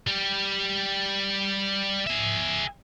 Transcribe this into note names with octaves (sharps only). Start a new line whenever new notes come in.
G3 G4
G#4 E5